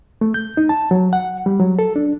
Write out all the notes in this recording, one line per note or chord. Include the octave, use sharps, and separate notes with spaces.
A3
G6
D#4
A5
F#3
F#5
G3
F#3
A4
D4